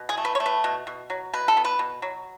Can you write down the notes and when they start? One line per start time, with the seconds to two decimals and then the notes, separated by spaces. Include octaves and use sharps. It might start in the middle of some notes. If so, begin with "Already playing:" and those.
Already playing: B2
0.09 G#4
0.17 A3
0.25 B4
0.35 C#5
0.40 A3
0.46 B4
0.64 B2
0.87 B2
1.10 F#3
1.33 B2 B4
1.48 A4
1.57 B3
1.65 B4
1.79 B2
2.02 F#3